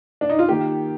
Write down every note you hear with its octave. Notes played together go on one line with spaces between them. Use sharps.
D4
D#4
F4
D#3 A#3 G4